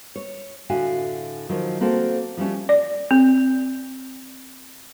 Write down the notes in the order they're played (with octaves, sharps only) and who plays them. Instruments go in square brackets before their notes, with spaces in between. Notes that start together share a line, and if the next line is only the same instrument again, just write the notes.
[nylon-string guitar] C#5
A2 D3 F#4 E5 F5 G#5
D#3 F3 F#3
A#3 C4 F#4 A4
F3 G3 A3 C#4
[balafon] D5
C4